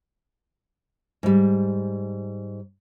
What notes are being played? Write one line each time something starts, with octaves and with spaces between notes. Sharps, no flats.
G#2 G3